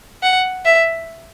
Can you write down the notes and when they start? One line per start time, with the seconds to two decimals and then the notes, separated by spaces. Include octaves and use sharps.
0.23 F#5
0.65 E5